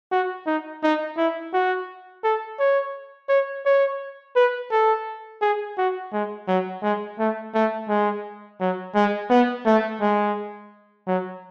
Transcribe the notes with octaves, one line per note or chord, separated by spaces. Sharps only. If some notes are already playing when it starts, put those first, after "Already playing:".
F#4
D#4
D#4
E4
F#4
A4
C#5
C#5
C#5
B4
A4
G#4
F#4
G#3
F#3
G#3
A3
A3
G#3
F#3
G#3
B3
A3
G#3
F#3